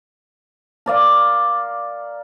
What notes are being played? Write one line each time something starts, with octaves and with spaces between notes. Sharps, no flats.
A#4 D5 F5